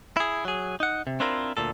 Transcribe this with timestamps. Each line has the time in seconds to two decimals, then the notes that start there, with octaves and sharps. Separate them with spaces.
0.17 E4 G#4
0.45 F#3 G#4
0.80 D#4 F#5
1.07 C3
1.20 C4 D4 E4 F4 A#4 C5
1.57 D2 A#2 A4